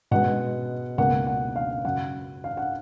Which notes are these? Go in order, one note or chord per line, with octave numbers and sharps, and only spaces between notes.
B2 G#3 B3 F#5
C#2 B2 A#3 F#5
F#5
F5
F#2 C#3 F#3 F#5
F5
F#5